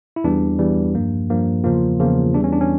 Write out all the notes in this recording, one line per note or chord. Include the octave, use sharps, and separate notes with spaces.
E4
E2 E3 G3 D4
E2 E3 G3
G2 F3 A#3
G2 F3 A#3
E2 C#3 F3 A#3 F4
E2 C#3 F3 A#3
E2 E3 G3 D4
C#4
D4
C#4